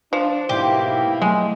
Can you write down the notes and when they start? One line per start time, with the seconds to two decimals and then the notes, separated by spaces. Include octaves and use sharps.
0.13 F3 D4
0.49 B1 G#2 A#3 B3 E4 G4 C6
1.22 F#3 G#3 A3